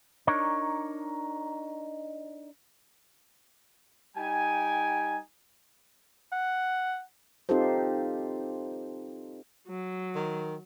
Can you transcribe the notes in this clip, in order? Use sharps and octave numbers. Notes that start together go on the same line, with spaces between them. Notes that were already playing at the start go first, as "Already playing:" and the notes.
D4 D#4 A#4 C#5
G3 D#4 G5 G#5
F#5
C4 D#4 F4 G4 A4 C5
F#3
D#3